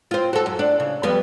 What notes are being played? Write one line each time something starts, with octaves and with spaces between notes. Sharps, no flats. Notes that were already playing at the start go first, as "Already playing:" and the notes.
C4 F4
F#4 A4
F#2
D4
C#3
F2 G3 B3